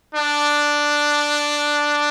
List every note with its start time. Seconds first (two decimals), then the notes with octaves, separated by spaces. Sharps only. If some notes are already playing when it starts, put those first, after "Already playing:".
0.15 D4